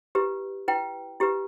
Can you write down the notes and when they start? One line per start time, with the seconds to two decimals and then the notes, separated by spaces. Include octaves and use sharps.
0.15 E4 G4 B4
0.68 E4 B4 G5
1.20 E4 G4 B4